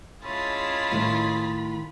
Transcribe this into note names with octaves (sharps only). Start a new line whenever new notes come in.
G#3 C#4 E4 F4 G#4 A5 B5
A2 D#3